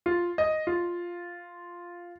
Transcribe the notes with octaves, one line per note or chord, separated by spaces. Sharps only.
F4
D#5
F4